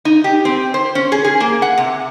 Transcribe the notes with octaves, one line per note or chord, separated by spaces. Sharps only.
D#4
G4
C4
C5
C#4
G#4
G#4
A#3
F#5
C3